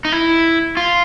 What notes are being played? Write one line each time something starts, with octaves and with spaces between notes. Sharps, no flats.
D#4
E4
F4